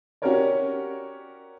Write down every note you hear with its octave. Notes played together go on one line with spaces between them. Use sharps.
C#4 F#4 G4 A#4 C#5 D5